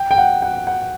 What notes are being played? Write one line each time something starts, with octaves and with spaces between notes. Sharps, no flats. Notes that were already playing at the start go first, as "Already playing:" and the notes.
Already playing: G5
G5
F#5
F#5
F#5